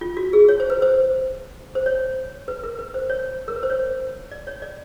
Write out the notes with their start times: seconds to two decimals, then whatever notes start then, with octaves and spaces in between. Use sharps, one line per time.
0.01 F4
0.17 F#4
0.33 G#4
0.49 C#5
0.60 C5
0.70 B4
0.82 C5
1.75 C5
1.86 C#5
2.48 B4
2.64 A#4
2.79 B4
2.94 C5
3.10 C#5
3.48 A#4
3.56 B4
3.63 C5
3.70 C#5
4.31 D5
4.47 C#5
4.62 D5